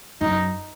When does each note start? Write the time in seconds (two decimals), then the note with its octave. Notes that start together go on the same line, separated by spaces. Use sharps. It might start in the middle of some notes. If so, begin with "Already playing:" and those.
0.21 F#2 D#4